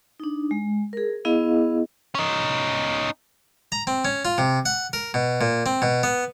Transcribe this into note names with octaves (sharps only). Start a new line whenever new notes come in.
D4 D#4
G#3
G#4 A#4
B3 E4 G#4 D#5 F5
C#4 D#4
A#5
C4
C#4
F4
C3
F#5
A#4
B2
A#2
C4
B2
B3